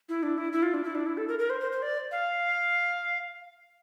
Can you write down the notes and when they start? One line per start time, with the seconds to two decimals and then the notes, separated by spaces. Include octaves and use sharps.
0.09 E4
0.23 D4
0.38 E4
0.53 E4
0.63 F4
0.74 D4
0.84 E4
0.95 D4
1.06 E4
1.18 A4
1.28 A#4
1.39 A#4
1.50 C5
1.61 C5
1.72 C5
1.82 D5
2.12 F5